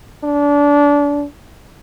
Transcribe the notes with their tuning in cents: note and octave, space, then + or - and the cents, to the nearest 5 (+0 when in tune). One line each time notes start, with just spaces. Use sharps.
D4 -25